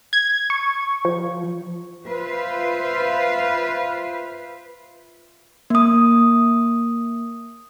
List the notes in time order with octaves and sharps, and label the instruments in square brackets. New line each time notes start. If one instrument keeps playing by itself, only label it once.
[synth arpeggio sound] G#6
C#6
F3
[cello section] F4 B4 C5 E5 F5
[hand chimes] A#3 D#6